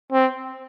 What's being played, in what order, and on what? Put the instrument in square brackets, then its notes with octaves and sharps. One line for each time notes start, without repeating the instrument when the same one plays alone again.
[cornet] C4